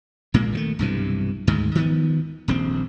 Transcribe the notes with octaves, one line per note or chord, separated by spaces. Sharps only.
A#1 A#2 G#3 A#3
D#3 E3 A3
B1 G2 C3 E3
D2 G#2 D#3 G#3
D#3 F3 B3
D#1 A#1 C4